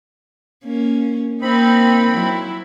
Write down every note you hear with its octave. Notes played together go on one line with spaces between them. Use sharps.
A#3 C#4
A#3 C4 D#4 B5
F#3 E4